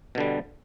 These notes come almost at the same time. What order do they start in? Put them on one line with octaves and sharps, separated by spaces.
B2 D3 G3